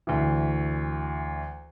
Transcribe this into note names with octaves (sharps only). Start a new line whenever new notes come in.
D2 E3